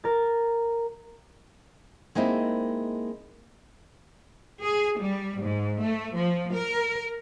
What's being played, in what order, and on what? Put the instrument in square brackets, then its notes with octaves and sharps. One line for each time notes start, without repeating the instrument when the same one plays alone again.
[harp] A#4 A6
[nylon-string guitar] G#3 A#3 C4 D#4 E4
[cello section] G#4
G3
G#2
A3
F3
A#4